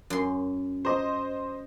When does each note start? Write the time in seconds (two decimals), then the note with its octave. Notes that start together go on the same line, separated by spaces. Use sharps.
0.10 F#2 C6
0.85 C5 D#5